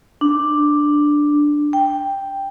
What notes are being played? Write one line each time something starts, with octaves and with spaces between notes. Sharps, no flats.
D4
G5